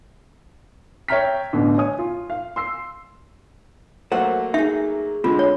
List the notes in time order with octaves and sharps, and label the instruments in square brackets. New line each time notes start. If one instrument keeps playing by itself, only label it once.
[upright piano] C#5 E5 G5 A#5 F6 B6
A1 B2 D3
C#5 G#5 D#6
F4
F5
C6 E6 C7
[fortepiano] F#3 A3 A#3 [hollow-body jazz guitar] C5 F#5
[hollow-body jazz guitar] D#4 G#4 [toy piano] E5
[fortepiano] D3 G#3 [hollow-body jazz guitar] C4 [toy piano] F4
[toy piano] C#5